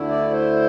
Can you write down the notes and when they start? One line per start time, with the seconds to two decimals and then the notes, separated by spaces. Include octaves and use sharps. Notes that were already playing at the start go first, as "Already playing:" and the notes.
Already playing: D2 D3 A3 E4
0.09 D5
0.31 C5